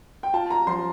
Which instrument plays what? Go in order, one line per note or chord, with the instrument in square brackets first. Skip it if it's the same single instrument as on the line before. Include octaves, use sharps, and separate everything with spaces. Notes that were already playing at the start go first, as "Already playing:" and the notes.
[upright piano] G5
F4 A5
A#5
F3 C6